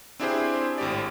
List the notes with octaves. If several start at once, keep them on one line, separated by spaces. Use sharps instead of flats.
C4 D4 E4 G4 G#4 C5
G#1 A2 G4 D5